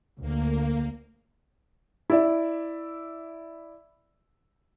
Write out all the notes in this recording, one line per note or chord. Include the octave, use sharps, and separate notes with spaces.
D2 A#3
E4 D5 E5